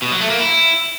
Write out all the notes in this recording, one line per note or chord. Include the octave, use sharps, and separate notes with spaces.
B2
F#3
A3
A#3
E4